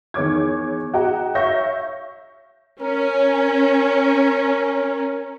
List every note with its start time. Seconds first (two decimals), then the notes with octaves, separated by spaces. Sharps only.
0.14 E2 D#3 C#5 D6 G#6
0.94 F#4 G#4 D#5 G5 A#5
1.35 C#5 E5 F5 C#6 G6 A#6
2.81 C#4 A#4